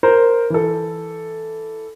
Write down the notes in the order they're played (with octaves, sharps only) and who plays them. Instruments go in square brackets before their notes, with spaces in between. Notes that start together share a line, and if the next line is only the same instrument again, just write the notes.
[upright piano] A#4 C5
E3 A4